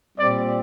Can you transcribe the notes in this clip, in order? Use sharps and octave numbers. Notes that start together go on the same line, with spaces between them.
A#2 G3 C4 D5